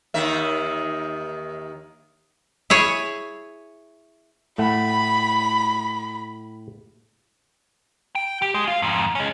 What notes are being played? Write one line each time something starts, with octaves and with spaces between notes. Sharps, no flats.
D#2 D#3 E5
E4 G#4 C#5 G#5
A2 A3 F#5 B5
G5
G4
G#3
F4 F5
F2 G#2
G#3 C#4